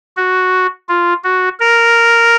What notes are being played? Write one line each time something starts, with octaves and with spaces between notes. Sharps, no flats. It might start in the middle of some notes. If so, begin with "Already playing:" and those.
F#4
F4
F#4
A#4